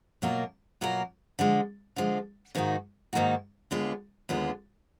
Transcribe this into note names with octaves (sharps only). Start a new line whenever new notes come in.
B2 F#3 A#3 F4 A#4
B2 F#3 A#3 F4 A#4
D3 F3 G#3
D3 F3 G#3
G#2 D#3 A#3 D#4 F#4
G#2 D#3 A#3 D#4 F#4
D#2 D3 G#3 B3 F4
D#2 D3 G#3 B3 F4